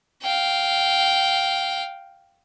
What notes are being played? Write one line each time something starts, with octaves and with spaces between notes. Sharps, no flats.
F5 G5